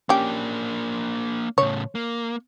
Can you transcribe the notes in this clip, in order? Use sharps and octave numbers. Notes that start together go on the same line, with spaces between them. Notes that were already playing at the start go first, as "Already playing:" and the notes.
A#3 C#4 D4 G4
A2 C#3 C#5
A#3